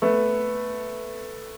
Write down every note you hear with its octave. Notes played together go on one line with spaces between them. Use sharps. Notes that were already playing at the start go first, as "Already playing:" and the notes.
A3 B3